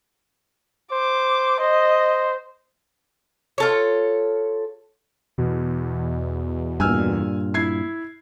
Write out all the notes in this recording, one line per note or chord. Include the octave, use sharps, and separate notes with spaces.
C5 D6
C5 D#5
F4 A4 C#5
E2 B2
G2 A#2 G#5 E6 F6
E4 G#6 C7